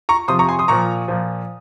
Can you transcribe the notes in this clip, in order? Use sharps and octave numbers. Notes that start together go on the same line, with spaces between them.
A#5 C#6
C3 F3 C6 D#6
A#5 C#6
G#5 C6
C6 D#6
A#2 F3 A#5 C#6
A#2 F3